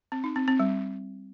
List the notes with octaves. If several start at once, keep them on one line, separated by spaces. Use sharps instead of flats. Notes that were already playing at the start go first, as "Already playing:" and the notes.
C4
D#4
C4
C4
G3